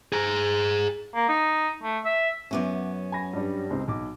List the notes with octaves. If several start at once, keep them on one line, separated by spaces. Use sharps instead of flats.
G#4 A#5
A#3
D#4
A3
E5
F#2 B3 C#4 E5 D6
G#5 B5 A#6
G2 G3
C#2 C4 D#4
B1 D6